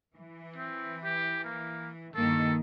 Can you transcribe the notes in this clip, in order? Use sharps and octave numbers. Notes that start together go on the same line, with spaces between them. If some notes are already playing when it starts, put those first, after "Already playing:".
E3
C4
G4
A#3
G2 D#3 A#3 A4